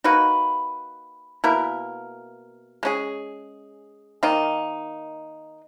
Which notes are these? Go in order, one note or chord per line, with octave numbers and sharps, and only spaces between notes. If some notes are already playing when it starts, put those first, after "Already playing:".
A#3 D#4 F#4 B4
B2 A#3 E4 A#4
G#3 C#4 G#4
D#3 A#3 D#4